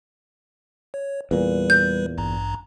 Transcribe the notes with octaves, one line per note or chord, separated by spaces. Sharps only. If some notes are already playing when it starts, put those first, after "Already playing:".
C#5
E2 A#2 G3 B4
G6
A1 G2 A#5